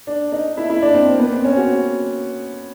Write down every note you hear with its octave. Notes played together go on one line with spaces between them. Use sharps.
D4
D#4
E4
E4
D4
C4
A#3
B3
C4
C#4
F#4